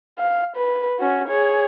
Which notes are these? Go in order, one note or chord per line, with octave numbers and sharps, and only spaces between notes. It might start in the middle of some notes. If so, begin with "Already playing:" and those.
F5
B4
C#4 F#4
G#4 C#5